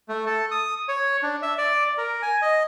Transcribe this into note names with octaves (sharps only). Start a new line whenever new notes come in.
A3
A4
D#6
C#5
D4
E5
D5
A#4
G#5
D#5